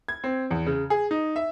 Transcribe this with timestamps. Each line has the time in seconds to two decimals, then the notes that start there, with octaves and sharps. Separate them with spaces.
0.08 G#6
0.24 C4
0.51 E2
0.67 C#3
0.90 G#4
1.11 D#4
1.36 E5